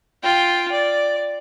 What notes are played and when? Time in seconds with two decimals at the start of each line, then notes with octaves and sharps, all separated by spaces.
0.23 F4 G5
0.72 D5